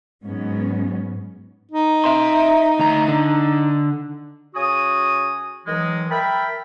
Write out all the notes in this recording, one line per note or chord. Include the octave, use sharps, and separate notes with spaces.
G#2 F#3 B3 C#4
D#4
E5 C6
D2 A#5
D3
C#3 F#4 G#5 D#6
D#3 E3 F#3 G#3
A#4 E5 G5 A5 B5